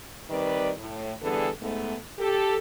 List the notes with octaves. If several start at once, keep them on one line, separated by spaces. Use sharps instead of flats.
D#3 G3 C4 B4 D5
A2
D3 E3 G3 B3 G#4 A4
G#2 A3 B3
G4 A4